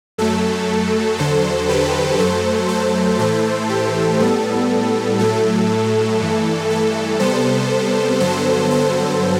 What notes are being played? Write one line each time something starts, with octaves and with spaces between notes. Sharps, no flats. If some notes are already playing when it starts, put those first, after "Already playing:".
F#2 F#3 A3 A4
E2 D3 F#3 A4 C5
G4 B4
F#2 F#3 A3 A4 C5
A4 C5
A2 E3 A3 A4 C5
G4
A2 G3 B3 A4
A2 F#3 A3 A4
G2 E3 A3
A4
C3 G3 B3 A4 C5
G2 D3 F#3 B3 A4 C5
A4 C5